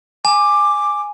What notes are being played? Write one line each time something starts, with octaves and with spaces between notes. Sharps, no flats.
G#5 D6